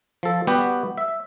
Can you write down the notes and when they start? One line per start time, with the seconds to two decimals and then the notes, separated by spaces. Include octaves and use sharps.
0.23 F3 A4
0.47 G3 B3 F#4 G4
0.98 E5